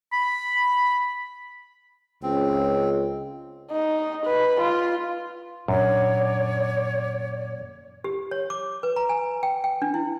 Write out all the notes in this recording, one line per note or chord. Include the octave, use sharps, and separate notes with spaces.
B5
C#2 C4
D#4
B4
F4
F#2 A#2 D4 C#5 D5
G4
C#5
D6
B4
A#5
G#5
G5
G5
D4
E4